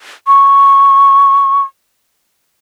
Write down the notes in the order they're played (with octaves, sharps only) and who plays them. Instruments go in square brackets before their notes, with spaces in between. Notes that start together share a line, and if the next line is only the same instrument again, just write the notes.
[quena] C#6